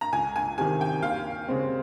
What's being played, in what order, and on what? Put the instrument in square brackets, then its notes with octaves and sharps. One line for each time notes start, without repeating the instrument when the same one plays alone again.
[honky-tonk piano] A#5
[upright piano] C#2 [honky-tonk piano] G#5
[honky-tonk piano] G#5
[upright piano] C3 D#3 [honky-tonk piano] G#5
[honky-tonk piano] G5
[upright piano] D#2 [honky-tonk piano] F5
[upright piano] C#3 G#3 C4